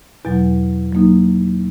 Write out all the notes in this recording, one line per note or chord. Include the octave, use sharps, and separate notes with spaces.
E2 B2 F#3
F#3 A#3 D#4